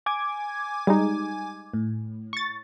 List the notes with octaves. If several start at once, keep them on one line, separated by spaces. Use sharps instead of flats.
G#5 D6 G#6
G3 G#3 D#4
A2
C#6 A6